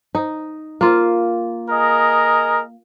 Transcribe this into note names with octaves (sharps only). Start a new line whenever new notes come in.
D#4
A#3 F4
G#4 A#4 D#5